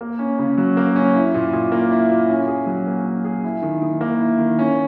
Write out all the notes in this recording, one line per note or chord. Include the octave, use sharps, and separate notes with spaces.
A#3
C#4
C#3
F#3
A#3
C#4
E4
A#2
A#2
A#3
E4
A#2
C#4
G#4
F#3
A#3
C#4
G#4
E4
D#3
D#3
A#3
E4
D#3
C#4